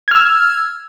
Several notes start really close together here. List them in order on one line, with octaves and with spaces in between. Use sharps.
G#6 F6 E6